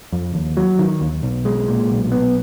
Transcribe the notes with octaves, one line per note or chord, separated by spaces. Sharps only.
F2
D#2
F#3
D#3
D#2
B1
G#3
A#2
B1
B3